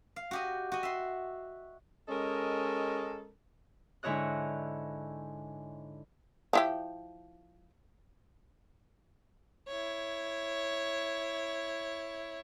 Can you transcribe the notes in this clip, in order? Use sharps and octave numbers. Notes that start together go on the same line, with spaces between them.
F5
F#4 G4 D#5
F#4 D#5
E5 C6
G#3 C#4 A4 A#4 D#5
G#2 D3 E4 C#5 D#5 F#6
F3 E4 G4
E4 C#5